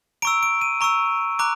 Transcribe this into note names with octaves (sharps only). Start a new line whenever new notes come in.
A#5 C#6 E6 D7
D7
D#7
A#5 C#6 E6
A#5 D6 F#6